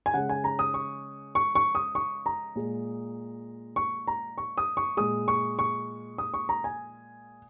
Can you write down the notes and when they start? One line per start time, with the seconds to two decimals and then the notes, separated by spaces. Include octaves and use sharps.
0.06 G#5
0.14 C#3 G#3 F#5
0.29 G#5
0.44 A#5
0.59 D#6
0.74 C#6
1.35 C#6
1.55 C#6
1.75 D#6
1.95 C#6
2.26 A#5
2.56 A#2 G#3
3.76 C#6
4.07 A#5
4.38 C#6
4.58 D#6
4.77 C#6
4.97 A#2 G#3 D#6
5.28 C#6
5.59 C#6
6.18 D#6
6.34 C#6
6.49 A#5
6.64 G#5